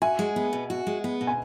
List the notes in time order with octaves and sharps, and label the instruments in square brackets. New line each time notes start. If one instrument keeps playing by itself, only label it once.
[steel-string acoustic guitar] F#4 [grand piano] E5 G#5
[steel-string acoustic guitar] G#3
B3
B2
F#4
G#3
B3
B2
[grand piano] G#5